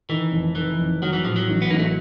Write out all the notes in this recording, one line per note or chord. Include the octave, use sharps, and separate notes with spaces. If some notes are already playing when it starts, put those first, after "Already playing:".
D#3 E3
F1
D#3 E3
F1
D#3 F#3
E3
A2 F3
F#3
A1
B3
A1 A#3
A3